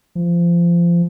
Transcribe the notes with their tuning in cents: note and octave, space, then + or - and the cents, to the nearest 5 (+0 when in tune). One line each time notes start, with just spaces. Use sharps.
F3 -25